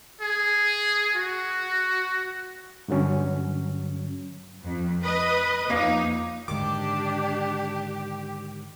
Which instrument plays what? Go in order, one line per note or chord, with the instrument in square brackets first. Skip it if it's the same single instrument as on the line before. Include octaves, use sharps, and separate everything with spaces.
[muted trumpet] G#4
F#4
[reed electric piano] G2 D3 F#3 C#4
[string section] F2
B4 D#5
[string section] F2 D#4 [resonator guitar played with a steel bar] A#3 C#5 F5
[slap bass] G#2 D3 D#3 [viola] D4 [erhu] G4 [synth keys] D6